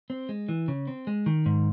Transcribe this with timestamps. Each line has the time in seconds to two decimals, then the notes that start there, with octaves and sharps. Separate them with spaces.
0.10 C4
0.29 G#3
0.49 E3
0.68 C#3
0.87 C4
1.07 G#3
1.26 D#3
1.46 G#2